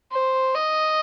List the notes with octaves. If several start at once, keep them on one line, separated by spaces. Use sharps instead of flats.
C5
D#5